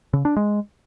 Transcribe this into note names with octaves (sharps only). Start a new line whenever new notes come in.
C#3
D4
G#3